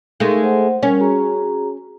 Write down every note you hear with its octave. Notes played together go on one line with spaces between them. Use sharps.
G#3 A3 D#4 A#4 F5
C5 F#5
G3 C#4 A#4 C#5
F#4 G#4 A#5